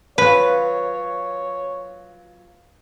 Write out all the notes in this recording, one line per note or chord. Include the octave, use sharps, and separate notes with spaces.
F#3 F4 B4 C#5